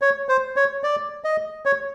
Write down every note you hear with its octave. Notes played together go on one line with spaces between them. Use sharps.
C#5
C5
C#5
D5
D#5
C#5